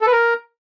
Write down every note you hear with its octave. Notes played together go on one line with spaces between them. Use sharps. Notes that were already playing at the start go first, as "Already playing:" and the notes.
A4
B4
A#4